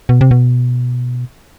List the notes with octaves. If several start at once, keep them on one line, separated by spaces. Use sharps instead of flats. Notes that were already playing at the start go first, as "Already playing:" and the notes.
B2
C3
B2